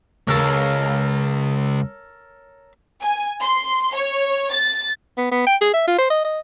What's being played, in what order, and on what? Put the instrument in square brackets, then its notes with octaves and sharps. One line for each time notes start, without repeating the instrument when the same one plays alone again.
[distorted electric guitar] C#2 [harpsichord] A4 A#4 C#5
[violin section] G#5
C6
C#5
A6
[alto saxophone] B3
B3
G5
G#4
E5
F4
C5
D#5
D#5